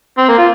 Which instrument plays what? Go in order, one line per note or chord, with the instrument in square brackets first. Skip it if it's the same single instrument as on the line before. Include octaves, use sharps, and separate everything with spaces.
[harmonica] C4
A#3
F4